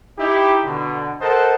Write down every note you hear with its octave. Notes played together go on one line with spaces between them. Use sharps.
D#4 E4 G4
B2 D3
A4 A#4 C5 D#5 F#5 A5